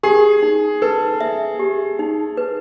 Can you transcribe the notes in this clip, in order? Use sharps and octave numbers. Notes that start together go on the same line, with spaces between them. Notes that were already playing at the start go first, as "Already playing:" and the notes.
G4 G#4
D#4
A4 B4
E5
G4
D#4
B4